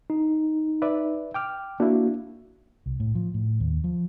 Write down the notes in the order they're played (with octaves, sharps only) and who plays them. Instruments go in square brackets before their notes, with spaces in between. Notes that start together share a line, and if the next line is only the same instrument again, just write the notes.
[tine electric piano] D#4
[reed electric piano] B4 D5 E5
G5 D6 F6
[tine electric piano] A#3 F#4 [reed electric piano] D4 E4
[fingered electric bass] C2
A2
F3
A2
D#2
F3